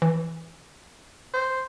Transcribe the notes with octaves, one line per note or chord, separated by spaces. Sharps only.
E3
C5